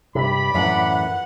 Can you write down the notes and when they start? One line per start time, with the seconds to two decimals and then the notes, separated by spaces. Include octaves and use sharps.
0.15 G2 C3 D5 B5
0.54 F#2 A2 E3 F#5